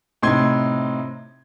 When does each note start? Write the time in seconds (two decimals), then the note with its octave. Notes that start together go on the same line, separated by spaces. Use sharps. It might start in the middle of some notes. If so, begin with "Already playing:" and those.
0.22 A2 C3 D#4 C6 G#6